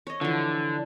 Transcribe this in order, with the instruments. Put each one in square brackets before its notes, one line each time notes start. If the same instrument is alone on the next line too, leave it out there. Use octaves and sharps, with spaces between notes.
[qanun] C#5 D#5
[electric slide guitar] D3 [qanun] E3 F3